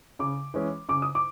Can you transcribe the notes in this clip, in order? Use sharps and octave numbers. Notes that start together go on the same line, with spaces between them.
C#3 D6
E3 G#3 C#4
C#3 D6
D#6
D6